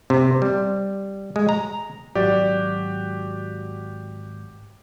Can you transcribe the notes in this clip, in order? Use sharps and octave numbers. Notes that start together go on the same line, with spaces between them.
C3
G3
G#3
A#5
G#1 F#3 F#4 G4 D5